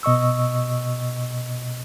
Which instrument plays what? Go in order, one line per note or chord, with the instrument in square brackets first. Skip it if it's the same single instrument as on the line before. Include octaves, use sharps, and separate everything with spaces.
[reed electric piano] B2 D#5 C#6 E6